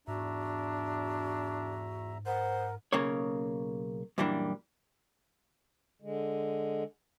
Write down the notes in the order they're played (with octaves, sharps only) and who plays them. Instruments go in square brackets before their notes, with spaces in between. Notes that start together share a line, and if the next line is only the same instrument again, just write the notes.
[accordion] E2 E5 A#5 [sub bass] G#2 [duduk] D4 [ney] F#4
[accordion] A#4 [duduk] C5 [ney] F#5
[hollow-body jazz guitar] B1 C#3 A#3 C#5
F#2 A#2 E3 G3 A#3 D4
[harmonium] D3 G#3